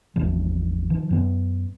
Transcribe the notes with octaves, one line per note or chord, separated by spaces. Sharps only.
G#1 E2 C3 F3
D#3 F3
F#2 B3